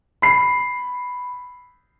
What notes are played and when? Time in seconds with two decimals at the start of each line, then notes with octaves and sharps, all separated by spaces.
0.22 B5 C7